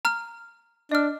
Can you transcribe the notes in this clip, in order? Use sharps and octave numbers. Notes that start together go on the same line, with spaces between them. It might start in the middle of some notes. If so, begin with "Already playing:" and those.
A#5 F6
D4 D#5 F6